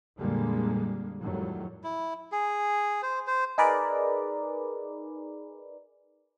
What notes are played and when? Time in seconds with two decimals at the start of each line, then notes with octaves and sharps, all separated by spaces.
0.20 F2 A#2 D3 G3 G#3 A#3
1.22 F2 A2 D#3 F#3 G3
1.84 E4
2.32 G#4
3.02 C5
3.27 C5
3.58 D#4 G#4 A#4 B4 D5